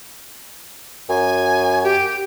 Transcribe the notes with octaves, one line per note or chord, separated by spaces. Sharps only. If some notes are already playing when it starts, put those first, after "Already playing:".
F#2 G#5
G4